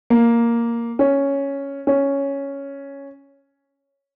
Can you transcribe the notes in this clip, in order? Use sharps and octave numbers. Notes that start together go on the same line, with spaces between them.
A#3
C#4
C#4